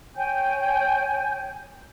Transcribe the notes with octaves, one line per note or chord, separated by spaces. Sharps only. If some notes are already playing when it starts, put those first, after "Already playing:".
C#5 G5 G#5 G6